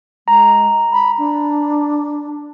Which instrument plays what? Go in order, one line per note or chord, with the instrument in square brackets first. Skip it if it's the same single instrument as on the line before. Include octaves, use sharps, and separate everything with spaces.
[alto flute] G#3 [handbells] A#5
[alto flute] B5
D4